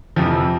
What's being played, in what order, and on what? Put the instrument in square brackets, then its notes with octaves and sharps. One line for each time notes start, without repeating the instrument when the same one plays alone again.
[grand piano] F2 C3 E3 F3